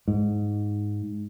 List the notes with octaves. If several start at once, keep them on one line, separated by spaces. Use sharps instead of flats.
G#2